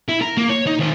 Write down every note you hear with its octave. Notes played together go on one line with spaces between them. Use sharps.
E4
A#4
A#3
C#5
D#4
D#3 C5